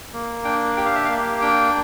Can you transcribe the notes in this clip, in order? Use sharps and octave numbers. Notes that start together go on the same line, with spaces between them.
A#3
D4 G5
G4 G5
F5
E5
A#3 F5
D4 G5